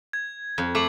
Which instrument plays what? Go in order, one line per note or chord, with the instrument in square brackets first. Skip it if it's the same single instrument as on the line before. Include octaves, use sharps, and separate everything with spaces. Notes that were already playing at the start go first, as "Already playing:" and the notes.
[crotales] G#6
[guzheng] F2
[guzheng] A3 [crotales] D6 C7 F#7